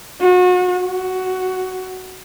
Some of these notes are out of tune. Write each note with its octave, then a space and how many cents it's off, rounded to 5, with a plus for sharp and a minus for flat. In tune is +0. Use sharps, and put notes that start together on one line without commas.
F#4 -35
F#4 +10